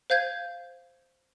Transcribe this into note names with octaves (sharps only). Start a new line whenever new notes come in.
C5 F5 G6 G#6